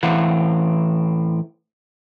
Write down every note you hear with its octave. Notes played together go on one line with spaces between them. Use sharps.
A2 E3 C4 F5 F#5